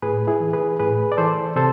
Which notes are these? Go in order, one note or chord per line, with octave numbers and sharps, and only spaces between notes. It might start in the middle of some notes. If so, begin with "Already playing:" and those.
A2 G#4 B4
E4 G#4
E3
G#4 B4
A2 G#4 B4
D5
E3 A4 C5
C3 A4 C5